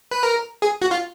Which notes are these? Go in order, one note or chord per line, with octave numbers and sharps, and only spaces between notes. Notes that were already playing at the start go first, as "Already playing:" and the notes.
B4
A#4
G#4
F#4
F4